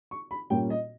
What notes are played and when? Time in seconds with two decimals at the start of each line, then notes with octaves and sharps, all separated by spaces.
0.11 C#6
0.31 B5
0.50 A#2 G3 A#3 C#4 G5
0.70 D#5